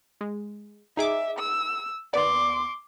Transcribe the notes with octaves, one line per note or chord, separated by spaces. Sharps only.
G#3
D#4 G#4 E5 D6
E6
D#2 B3 D5 C6 D6